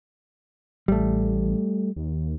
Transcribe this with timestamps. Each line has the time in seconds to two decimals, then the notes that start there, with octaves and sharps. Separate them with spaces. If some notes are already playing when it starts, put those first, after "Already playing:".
0.88 A1 G3 A3
1.96 D#2